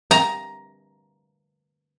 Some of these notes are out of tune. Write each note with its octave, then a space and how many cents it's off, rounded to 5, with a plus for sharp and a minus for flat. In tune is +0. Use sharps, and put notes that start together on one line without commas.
A#5 +10